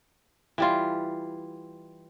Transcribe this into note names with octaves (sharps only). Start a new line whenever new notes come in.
E3 G3 F4